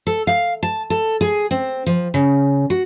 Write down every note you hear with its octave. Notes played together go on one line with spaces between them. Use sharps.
A4
F5
A5
A4
G#4
C4
F3
C#3
F#4